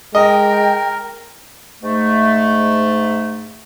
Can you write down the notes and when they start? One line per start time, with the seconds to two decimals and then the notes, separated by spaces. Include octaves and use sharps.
0.15 G#3 A#4 D#5 G5
1.82 G#2 A3